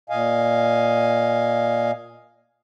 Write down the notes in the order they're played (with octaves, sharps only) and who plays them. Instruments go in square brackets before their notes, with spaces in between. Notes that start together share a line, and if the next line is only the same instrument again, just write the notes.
[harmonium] A#2 D#5 F5 G#5